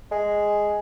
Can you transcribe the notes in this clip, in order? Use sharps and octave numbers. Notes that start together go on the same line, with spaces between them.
G#3